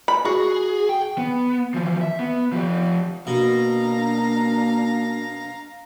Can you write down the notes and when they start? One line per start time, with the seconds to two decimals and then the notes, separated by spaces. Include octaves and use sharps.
0.08 B5
0.25 F#4 G#4
0.89 G5
1.18 B3
1.74 E3 F3
2.01 E5
2.19 B3
2.53 F3 G4
3.27 B2 A#3 D4 F5 A#5